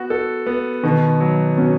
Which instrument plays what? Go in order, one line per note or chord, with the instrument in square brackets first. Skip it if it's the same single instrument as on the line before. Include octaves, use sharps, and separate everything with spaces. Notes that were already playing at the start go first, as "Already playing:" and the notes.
Already playing: [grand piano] B3 F#4
A4
B3
[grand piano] B2 [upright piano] D#3
[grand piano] F#3
[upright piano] B2 [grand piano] C#4